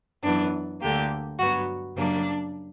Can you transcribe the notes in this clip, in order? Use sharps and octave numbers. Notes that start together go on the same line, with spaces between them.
F#2 E3 B3 D4
D2 D3 A#3 G4
G2 F#3 B3 F#4
F#2 C#3 G3 A#3 D4